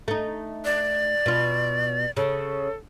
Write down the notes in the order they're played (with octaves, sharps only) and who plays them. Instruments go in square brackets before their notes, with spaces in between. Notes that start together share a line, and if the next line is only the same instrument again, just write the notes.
[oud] A3 D#4
[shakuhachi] D5
[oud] B2 F4
[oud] C#3 [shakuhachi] A4